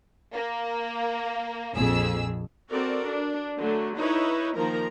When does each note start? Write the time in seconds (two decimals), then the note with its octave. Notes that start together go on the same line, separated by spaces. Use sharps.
0.34 A#3
1.75 A#1 F2 G#4 E6
2.70 C4 F#4 A4 A#4 D5
3.05 D4
3.58 D3 F#3 A3
3.97 D#4 E4 B4 C#5
4.56 D#3 F3 A#3 A#4 A#5